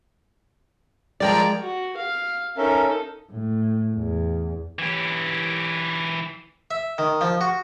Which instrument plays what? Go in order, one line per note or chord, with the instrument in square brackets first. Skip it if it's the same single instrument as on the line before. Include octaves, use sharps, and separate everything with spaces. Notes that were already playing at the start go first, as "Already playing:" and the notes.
[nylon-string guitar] F3 G#3 A#4 [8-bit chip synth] D5 G5 A#5
[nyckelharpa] F#4
F5
[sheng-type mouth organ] C#4 A#4 E5 [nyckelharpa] D#4 A4
[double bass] A2
E2
[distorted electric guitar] E3 G4
[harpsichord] E5
D#3
F3
F#4